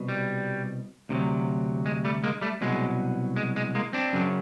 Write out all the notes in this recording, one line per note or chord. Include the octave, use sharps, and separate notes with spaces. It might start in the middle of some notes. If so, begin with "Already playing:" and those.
Already playing: C2 B2
G3
D2 C3 D#3
F#3
G#3
G3 A3
G#3 A#3
G3 A3
C2 B2 F#3 G#3
G#3
G#3
G#3 A#3
C4 D4
F#2 C#3 F#3